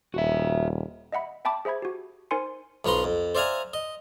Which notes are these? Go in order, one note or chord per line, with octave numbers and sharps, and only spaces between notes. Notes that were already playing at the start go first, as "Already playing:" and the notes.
D#1 F#4 E5
D#5 E5 F#5 B5
E5 G5 A5 B5 D6
G#4 C5 E5 B5 G#6
F#4 G4
D#4 A#4 C5 G#5 C6 C#7
B1 F3 B4 A#5 C6
F2
C5 D5 E5 F5 G#5 A#5
D#5